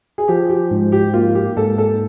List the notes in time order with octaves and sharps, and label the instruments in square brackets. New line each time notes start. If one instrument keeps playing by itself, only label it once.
[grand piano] G#4
[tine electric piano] F3 [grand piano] G4
[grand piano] G4
[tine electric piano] G#2
[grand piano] G4
[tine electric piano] A#3 [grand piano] F4
[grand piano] G4
[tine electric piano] G#2 [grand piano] A4
[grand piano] A4